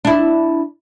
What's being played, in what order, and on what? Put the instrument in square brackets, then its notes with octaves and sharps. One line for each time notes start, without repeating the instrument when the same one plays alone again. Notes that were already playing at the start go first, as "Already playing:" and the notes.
[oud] D4 E4